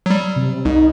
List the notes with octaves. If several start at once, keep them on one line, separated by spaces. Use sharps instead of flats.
F#3 G3
C3
C2 D#4